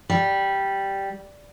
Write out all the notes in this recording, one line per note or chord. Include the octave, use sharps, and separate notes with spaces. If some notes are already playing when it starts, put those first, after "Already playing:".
G3